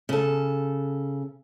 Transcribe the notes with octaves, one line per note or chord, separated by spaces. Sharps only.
C#3 A4